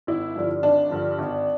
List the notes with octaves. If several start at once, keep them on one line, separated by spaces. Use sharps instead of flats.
G#1 E4
G2 D3 F3
G#1 D4
G2 D3 F3
G#1